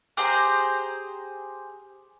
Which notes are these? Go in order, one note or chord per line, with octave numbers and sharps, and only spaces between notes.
G4 G#4 C5 A#5